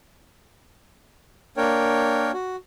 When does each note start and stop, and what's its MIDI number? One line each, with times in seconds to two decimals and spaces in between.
1.57 2.31 58
1.57 2.31 62
1.57 2.31 70
1.57 2.31 73
1.57 2.31 79
2.34 2.56 66